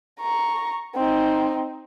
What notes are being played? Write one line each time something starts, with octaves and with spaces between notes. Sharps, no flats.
A#5 C#6
C4 D#4